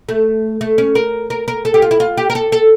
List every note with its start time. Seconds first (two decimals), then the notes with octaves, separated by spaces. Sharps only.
0.09 A3
0.61 A3
0.78 C#4
0.95 A#4
1.30 A#4
1.48 A#4
1.65 A4
1.74 G4
1.82 F4
1.91 E4
2.00 F4
2.17 G4
2.30 A#4
2.35 A4
2.52 A4